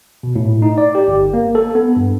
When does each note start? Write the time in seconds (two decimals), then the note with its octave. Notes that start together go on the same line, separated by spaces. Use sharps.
0.23 B2
0.36 A2
0.62 D#4
0.78 D5
0.95 G4
1.08 G1
1.34 A#3
1.55 A4
1.75 B3
1.96 G2